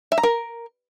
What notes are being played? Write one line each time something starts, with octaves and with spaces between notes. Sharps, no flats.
E5
A#5
A#4